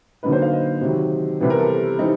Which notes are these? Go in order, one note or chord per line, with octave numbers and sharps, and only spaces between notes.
D3 F#3 A#3 D#4 B4
C5
F5
D#5
C3 D#3 F#3
C3 E3 G3 B3
A#4
A4
E3 G3 C4 D#4